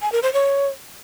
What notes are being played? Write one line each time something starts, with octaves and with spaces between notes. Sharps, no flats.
G#5
A#4
C5
C#5